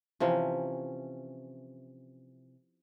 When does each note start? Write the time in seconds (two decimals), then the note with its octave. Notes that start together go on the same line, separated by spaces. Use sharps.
0.20 C3 E3 F3 C#4